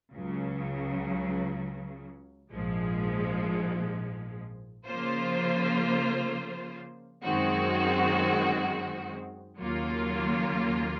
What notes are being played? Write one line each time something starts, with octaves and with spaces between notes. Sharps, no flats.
C#2 C#3 F#3
A#1 G#2 F3 G#3
C#3 F3 A#3 F4 C5
F#2 D#3 G#3 C4 F#4
D#2 C#3 F#3 A#3 F4